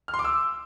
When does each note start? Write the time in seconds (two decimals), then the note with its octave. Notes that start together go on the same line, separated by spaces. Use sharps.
0.08 F6
0.14 C6
0.19 D6
0.25 E6